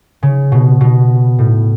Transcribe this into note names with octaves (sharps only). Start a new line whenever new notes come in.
C#3
B2
B2
A2